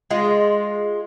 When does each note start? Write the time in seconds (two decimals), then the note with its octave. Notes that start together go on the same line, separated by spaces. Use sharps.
0.10 G#3 F4